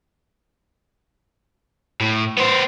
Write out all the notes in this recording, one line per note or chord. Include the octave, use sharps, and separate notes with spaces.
A2
B3 C5